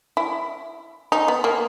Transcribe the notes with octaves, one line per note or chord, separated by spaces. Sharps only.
E4
D#4
B3
A#3